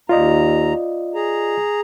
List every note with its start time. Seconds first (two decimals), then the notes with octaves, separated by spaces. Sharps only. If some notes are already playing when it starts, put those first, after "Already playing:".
0.09 D#2 F4 D5 D#5 A#5
1.15 G#4 A#5